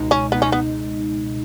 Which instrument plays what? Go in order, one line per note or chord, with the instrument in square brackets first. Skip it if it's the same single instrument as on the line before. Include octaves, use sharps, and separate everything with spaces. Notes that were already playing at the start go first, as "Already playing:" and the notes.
Already playing: [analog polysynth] C#2 B2 G#3 D#4
[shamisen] C#4
[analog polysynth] C#2 B2 G#3 D#4 [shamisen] B3
[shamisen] C#4
B3